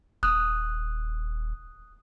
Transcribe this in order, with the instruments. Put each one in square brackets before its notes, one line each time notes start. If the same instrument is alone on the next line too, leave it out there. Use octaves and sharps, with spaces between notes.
[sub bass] D#1 [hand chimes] D#6 F#6